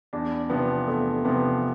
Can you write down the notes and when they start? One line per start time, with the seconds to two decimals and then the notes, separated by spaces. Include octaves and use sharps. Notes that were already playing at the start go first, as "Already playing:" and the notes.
0.13 E2 D4
0.50 C3 F3 B3
0.87 E2 A3
1.25 C3 F3 B3